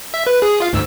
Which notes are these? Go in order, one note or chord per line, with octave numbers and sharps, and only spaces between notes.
E5
B4
G#4
F4 F5
D2 G#2 E6